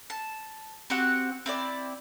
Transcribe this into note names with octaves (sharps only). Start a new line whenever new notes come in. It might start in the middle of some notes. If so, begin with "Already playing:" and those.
A5
C4 F#4 G4 F#5
C4 E4 D5